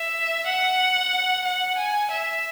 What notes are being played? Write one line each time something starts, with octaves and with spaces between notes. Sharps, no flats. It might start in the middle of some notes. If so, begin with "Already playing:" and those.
Already playing: E5
F#5
F#5
G#5
E5